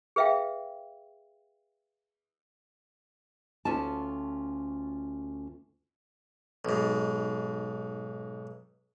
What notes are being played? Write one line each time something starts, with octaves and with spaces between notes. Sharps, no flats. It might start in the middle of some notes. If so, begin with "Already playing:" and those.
G#4 B4 E5 F5 G5
D2 C#4 F4 A5
B1 G#2